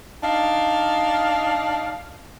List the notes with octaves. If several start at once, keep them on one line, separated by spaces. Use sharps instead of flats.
D4 D#4 F5